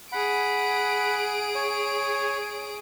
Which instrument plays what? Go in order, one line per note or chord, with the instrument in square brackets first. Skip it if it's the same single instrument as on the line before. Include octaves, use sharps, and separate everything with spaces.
[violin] G#4 D7 [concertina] F#5 B5
[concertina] C#5